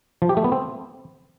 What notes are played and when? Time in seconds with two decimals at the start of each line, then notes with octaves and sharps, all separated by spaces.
0.22 F3
0.29 G4
0.37 A3
0.44 B3
0.52 C4